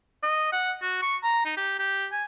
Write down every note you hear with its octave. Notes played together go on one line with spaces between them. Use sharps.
D#5
F#5
F#4
C#6
A#5
D#4
G4
G4
G#5